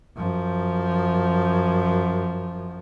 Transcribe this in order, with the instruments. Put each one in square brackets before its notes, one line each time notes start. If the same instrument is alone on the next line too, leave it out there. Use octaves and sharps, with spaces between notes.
[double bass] F#2 F3